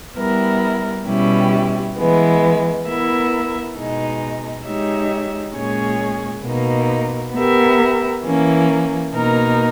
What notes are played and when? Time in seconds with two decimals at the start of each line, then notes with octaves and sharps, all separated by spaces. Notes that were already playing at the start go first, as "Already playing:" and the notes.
0.17 G3 B3 E4 A#4
1.07 B2 G3 C#4 E4 G4
1.96 E3 G#3 B3
2.86 B3 E4 A#4 E5
3.76 B2 G#3 D#4
4.65 G#3 D#4 G4 C#5 E5
5.55 A#2 G#3 C#4 G#4 C#5
6.45 B2 A#3 D#4
7.34 B3 G4 A#4 E5
8.24 E3 A#3 C#4
9.14 B2 A#3 D#4 A#4